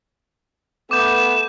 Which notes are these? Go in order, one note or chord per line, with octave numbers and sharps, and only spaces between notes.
A3 B3 D6 G6 E7